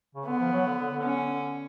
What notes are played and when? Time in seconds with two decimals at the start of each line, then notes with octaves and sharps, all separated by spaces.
0.15 C#3
0.27 D3 B3
0.39 F3
0.53 F#3
0.66 D3
0.79 D3
0.91 D3
1.04 C#4